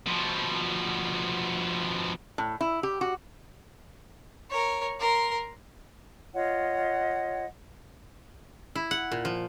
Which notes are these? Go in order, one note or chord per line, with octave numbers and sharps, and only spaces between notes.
B2 F3
A2
E4
G4
F#4
A#4 C#5
A#4 C6
F4 C#5 D#5 F#5
E4
F#5
A#2
F3